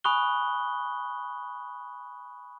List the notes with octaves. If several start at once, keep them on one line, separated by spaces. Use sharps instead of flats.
G#5 B5 C#6 D#6 F#6 G7